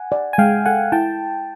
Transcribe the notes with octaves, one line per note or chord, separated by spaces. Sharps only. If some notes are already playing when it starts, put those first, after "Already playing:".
Already playing: F#5 G#5
D5
G#5
G#3 F5 G5
A4 F#5 G#5
E4 G5 A5